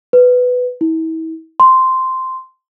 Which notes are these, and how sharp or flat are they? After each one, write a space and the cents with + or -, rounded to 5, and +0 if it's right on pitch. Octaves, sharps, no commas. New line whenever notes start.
B4 +10
E4 -40
C6 -5